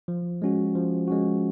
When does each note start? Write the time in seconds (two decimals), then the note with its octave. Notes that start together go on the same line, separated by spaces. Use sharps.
0.08 F3
0.42 G#3 C#4 F#4
0.75 F3
1.08 G#3 C#4 F#4